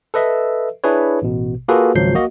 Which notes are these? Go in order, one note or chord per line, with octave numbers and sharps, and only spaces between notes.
A4 B4 D#5 E5
D4 E4 G#4 B4 C#5
A1 B2
A#3 F4 F#4 G#4 A4 B4
G#1 C#2 F3 F#3 G6 C7
A#3 F#4 D#5